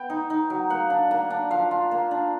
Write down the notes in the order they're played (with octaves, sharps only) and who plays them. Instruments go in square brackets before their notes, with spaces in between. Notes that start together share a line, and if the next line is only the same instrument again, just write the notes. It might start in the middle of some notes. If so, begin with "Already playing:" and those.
Already playing: [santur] B3 G5
D#4
D#4
F#3
A#3 F#5
D4
A#3
D4
F3 F5
F4
A#3
D4